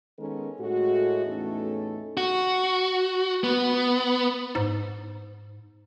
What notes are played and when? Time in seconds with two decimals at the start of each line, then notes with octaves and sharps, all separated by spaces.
0.18 D#3 G#3 B3 C#4 A4 A#4
0.60 A2 G#3 F#4
1.26 E2 A2 A3 C#4 D#4 A4
2.17 F#4
3.44 B3
4.55 G#2